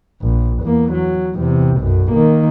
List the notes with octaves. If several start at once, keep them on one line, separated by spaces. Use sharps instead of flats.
A#1
E2 A#3
F#3
E2 C3
B1 F#2
D#3 A#3